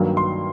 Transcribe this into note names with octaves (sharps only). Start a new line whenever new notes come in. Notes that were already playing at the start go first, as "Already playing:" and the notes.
Already playing: G2 D#3 F#3 A#3
C6